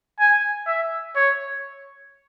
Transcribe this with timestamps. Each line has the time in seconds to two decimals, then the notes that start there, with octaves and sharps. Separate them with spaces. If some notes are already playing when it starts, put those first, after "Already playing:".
0.19 G#5
0.67 E5
1.16 C#5